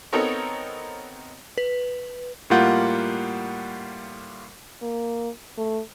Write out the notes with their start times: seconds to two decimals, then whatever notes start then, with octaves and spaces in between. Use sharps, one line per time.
0.13 B3 C4 D#4 A4 A#4 C#5
1.58 B4
2.50 A2 G3 A#3 F4 F#5 G6
4.82 A#3
5.57 A3